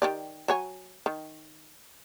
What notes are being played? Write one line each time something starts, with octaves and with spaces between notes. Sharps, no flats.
D#3 G4 D5
F#3 C#5 G#5
D#3